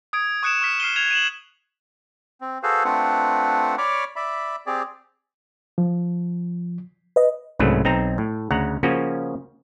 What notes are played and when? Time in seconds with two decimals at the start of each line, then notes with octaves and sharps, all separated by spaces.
0.13 D#6 G#6 D7
0.43 C#6 D#6 F#6 C#7 D7 E7
0.61 C#6 F6 B6 C#7
0.80 F6 C7 D#7 G7
0.96 G#6 F7
1.11 D#7 E7 F#7
2.41 C4
2.63 F#4 G#4 A4 B4 C5 F5
2.85 A3 C4 D4 F4 B4 F#5
3.78 C#5 D5 B5 C#6 D6 F6
4.16 D5 E5 B5
4.66 C4 G4 G#4 D5
5.78 F3
7.16 B4 D#5
7.59 C2 G#2 C#3 F#3 A3 B4
7.85 B1 C4 D#4 A#5
8.18 A2
8.51 D2 C#3 F#5 A#5
8.83 C#3 F3 A#3 C#4 F#4